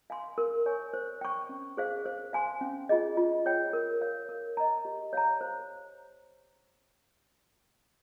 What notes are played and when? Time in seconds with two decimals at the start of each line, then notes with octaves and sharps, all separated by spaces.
0.10 F5 G#5 C6
0.38 A#4
0.66 C#5 G#5 C#6
0.94 C5
1.21 G5 C#6
1.49 C#4
1.77 G#4 C5 F5
2.06 C5
2.33 F5 G#5 C6
2.61 C#4
2.89 F4 G#4 D#5
3.17 F4
3.45 G#4 C#5 G5
3.73 A#4
4.01 C#5 F5
4.29 A#4
4.57 D#5 A#5
4.85 G4
5.13 C#5 F5 A#5
5.41 C5